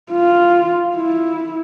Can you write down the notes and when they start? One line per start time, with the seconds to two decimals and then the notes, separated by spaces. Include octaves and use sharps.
0.12 F4
0.95 E4